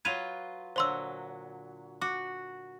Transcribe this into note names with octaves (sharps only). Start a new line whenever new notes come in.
F#3 F4 B4 G#6 D#7 F7
A#2 D3 F#3 C5 C6 E6
F#4 D6